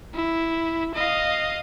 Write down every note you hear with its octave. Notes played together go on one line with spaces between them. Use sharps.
E4
D#5 F5